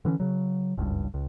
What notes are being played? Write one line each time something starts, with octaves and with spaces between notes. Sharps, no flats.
D3 E3 C4 C#4
C#3 F#3
F#1 C#2 G2
C#2